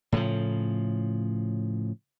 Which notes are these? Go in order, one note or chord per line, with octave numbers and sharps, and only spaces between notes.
A2 C#3 F3